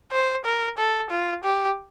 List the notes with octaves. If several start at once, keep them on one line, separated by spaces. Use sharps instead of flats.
C5
A#4
A4
F4
G4